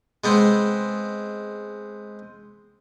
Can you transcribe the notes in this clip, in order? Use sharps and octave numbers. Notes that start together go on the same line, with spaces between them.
G#3 B3 C4